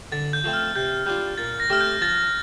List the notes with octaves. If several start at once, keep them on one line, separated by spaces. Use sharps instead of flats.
D3 A6
G6
F3 A3 C4
F6
C3 G6
G3 D4 F4 G6
A#2 A6
A#6
A3 C4 G4 F6
G6
F3 A6